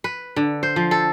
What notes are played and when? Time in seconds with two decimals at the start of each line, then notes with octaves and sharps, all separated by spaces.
0.04 B4
0.36 D3
0.63 C5
0.76 F3
0.91 A4